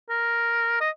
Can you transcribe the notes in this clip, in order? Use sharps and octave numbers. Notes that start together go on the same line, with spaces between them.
A#4
D#5